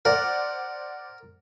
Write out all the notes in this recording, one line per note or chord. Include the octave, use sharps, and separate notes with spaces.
A#4 C5 D5 F#5